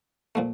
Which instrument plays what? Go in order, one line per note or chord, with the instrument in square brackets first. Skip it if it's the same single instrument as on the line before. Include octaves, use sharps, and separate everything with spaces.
[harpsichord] A#2 F3 A3